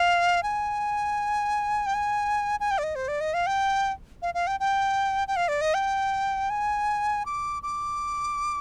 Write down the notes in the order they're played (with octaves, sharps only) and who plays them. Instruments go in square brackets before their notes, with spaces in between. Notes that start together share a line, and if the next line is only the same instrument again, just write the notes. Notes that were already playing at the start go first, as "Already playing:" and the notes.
Already playing: [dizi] F5
G#5
G5
G#5
G#5
G5
D5
D#5
C5
D5
D#5
F5
G5
F5
F5
G5
G5
G5
F5
D5
D#5
G5
G#5
D6
D6